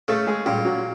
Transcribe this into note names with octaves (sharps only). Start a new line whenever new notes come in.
C#3 A3 A4
G#3 G#4
A#2 G3 G4
F#3 F#4